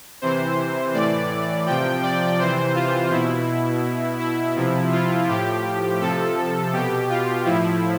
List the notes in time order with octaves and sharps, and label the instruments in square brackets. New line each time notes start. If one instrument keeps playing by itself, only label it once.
[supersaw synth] C3 E3 C5
A2 E3 D5
C3 F3 G5
D5
C3 E3 C5
F4
B2 E4
B2
E4
C3 F3
F4
A2 F3 G4
C3 F3 A4
B2 G4
F4
A2 F3 E4